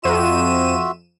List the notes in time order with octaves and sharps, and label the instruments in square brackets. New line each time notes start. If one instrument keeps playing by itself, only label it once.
[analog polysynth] F2 D#7 E7 [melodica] F4 F#4 E5